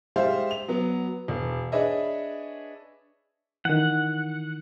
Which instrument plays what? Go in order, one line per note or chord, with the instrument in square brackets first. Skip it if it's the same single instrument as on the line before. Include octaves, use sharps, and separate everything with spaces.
[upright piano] G3 G#3 C5 E5 F5
F7
F#3 B3
E1
D4 G#4 B4 C#5 D#5 E5
[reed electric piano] D#3 E3 [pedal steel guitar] F#5